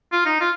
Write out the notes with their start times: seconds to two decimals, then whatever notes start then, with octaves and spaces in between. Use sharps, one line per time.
0.12 F4
0.26 D#4
0.40 F4